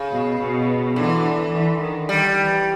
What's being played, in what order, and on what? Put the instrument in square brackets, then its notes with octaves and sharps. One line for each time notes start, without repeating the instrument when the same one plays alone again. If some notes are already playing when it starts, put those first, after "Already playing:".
Already playing: [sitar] C#3
[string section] B2
B2
[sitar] D3 [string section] E3
[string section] E3
D#3
[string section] D#3 [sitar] G3
[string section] E3